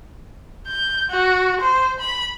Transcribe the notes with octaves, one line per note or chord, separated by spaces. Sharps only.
G6
F#4
C5
B5